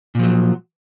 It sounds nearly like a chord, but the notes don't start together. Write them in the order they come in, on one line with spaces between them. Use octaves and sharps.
A#2 F3 F#3